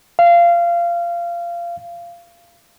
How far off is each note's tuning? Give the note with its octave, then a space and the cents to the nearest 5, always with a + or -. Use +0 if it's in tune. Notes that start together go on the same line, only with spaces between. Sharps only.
F5 -20